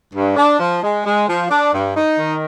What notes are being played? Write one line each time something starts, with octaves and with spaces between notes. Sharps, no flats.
G2
D4
F3
G#3
G#3
F3
D4
G2
D#4
D#3